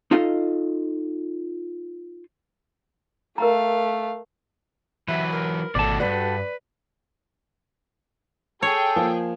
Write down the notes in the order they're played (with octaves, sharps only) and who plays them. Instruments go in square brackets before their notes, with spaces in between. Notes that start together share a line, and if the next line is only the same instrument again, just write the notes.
[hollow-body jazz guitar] D#4 F4 A4 D#5 F5
[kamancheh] A3 F5 [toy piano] A#4 A#5
[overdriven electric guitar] E3 F#3 [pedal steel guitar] B4 [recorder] E5
[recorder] A#4
[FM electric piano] G#1 D#3 [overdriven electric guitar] B2 A3 [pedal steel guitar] D5 A5
[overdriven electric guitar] D2 G2 [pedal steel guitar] F#4 G4 A4 [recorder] B4 [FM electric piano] D5
[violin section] G#4 G5 [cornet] A4 [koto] C#5
[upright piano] F3 A#3